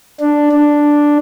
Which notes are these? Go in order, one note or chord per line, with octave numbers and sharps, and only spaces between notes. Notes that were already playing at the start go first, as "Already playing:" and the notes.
D4
D4